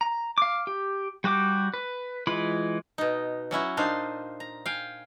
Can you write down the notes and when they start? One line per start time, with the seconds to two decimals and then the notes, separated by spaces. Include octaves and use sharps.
0.01 A#5
0.38 F5 D6
0.67 G4
1.24 G3 F#4 G4 D6
1.74 B4
2.27 E3 G#3 F4 B5
2.98 B2 D#4
3.51 F#3 C#4 E4 F#4
3.77 A#2 D4 D#4 C5 F5
4.40 A#5
4.66 F5 G5 G#5